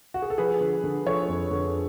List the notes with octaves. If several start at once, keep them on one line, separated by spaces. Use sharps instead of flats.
F#4
G#4
A4
F3 G#4 B4
D3
D3
F3 A4 C#5
F2
D3